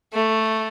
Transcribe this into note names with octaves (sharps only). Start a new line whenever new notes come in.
A3